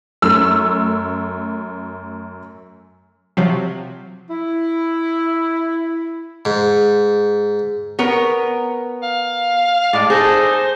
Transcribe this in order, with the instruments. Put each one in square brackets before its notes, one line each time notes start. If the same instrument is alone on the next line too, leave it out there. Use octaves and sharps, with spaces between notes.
[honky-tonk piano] F#2 A3 E6
[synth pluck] C3 F3 F#3
[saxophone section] E4
[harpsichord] G#2
[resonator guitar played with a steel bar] B3 A#4 C#5
[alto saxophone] F5
[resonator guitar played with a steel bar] A2 [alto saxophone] G#3 [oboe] D5
[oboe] D#4 [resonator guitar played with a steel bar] G#4 A4 [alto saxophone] C5